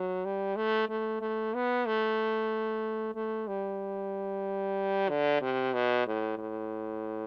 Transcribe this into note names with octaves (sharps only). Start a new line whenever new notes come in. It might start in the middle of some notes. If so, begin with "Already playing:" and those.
Already playing: F#3
G3
A3
A3
A3
B3
A3
A3
G3
D3
C3
B2
A2
A2